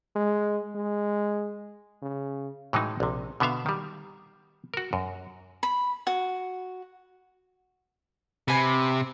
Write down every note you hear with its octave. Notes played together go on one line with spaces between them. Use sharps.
G#3
G#3
C#3
A2 E3 F#3 G#3 D#4
A#1 C3
B2 D3 B3 E5 F5
D#3 G3
F#4 A#4
F#2
B5
F#4
C3 B4 G#5 B5